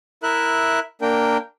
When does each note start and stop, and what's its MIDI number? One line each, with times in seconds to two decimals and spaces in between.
0.23 0.80 64
0.23 0.80 70
0.23 0.80 76
0.23 0.80 90
1.02 1.37 58
1.02 1.37 62
1.02 1.37 70
1.02 1.37 79